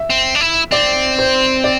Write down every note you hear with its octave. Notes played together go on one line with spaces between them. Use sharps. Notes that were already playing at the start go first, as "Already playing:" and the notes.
Already playing: E5
C4
D4
E4
C4 D5
C5
D5